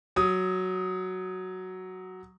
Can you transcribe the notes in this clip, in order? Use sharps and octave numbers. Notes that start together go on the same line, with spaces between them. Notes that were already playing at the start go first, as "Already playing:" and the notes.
F#3 D#6